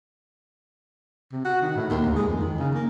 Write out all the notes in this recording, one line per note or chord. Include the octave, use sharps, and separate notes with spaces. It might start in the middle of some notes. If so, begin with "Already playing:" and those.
C3
F#4
D#3
A2
D#2
D2
G#3
F2
D#3
C#3
A#3